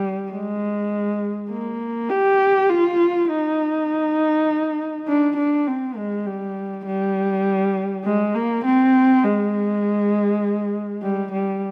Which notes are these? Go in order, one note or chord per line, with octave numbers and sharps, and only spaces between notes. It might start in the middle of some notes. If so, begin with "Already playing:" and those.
Already playing: G3
G#3
A#3
G4
F4
D#4
D4
D4
C4
G#3
G3
G3
G#3
A#3
C4
G#3
G3
G3